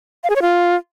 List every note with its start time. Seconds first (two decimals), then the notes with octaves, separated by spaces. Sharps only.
0.24 F5
0.30 G#4
0.36 C#5
0.42 F4